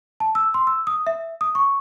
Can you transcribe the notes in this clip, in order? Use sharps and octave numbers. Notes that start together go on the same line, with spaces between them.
A5
E6
C6
E6
D#6
E5
D#6
C#6